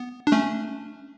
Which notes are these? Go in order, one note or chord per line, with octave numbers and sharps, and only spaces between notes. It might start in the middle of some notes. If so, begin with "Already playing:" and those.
Already playing: B3
D4
A3 C#4